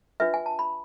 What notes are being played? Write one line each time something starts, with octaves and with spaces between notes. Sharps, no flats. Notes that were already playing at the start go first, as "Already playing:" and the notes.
D4 F4 B4 E5
G#5
A5
B5